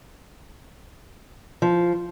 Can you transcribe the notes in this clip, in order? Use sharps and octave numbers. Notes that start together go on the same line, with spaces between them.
F3